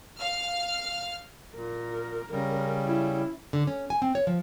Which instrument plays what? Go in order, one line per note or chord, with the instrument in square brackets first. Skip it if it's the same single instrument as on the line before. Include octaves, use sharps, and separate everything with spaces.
[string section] F5 F6
[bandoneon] A#2 [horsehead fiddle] A#4
[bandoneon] C#3 G3 [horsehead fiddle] C#4 A#4
[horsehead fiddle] C#4 E4
[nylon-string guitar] D3
C#4
G#5
C4
C#5
F3